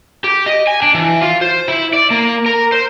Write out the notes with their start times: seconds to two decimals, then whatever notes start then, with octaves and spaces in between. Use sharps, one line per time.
0.24 G4
0.46 D#5
0.67 G#5
0.82 D4
0.94 E3
1.21 F4
1.41 C5
1.68 E4
1.93 D5
2.11 A#3
2.46 A#4
2.72 C5